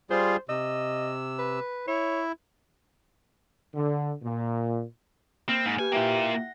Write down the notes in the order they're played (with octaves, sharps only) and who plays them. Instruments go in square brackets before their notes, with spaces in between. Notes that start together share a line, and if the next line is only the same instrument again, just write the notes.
[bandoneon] G3 F4 G#4 [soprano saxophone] C5
[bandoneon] C3 E6 [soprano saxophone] D#5
[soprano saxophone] B4
[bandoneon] E4 [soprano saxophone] C#5
[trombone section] D3
A#2
[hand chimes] A#3 F6 [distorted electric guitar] C4
[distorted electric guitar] G#2 [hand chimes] G#5 G6
[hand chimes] G4 B4 [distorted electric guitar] G#5
[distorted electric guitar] A#3 F4 [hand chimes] E4 E5 G5
[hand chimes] F#5 A#6